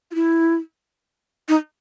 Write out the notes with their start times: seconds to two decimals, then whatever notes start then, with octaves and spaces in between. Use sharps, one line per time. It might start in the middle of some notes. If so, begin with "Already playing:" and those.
0.11 F4
0.15 E4
1.48 D#4